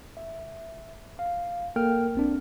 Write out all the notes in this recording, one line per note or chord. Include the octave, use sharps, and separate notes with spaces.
E5
F5
A#3 A4 A#4 G5 F6
A#1 C4 D4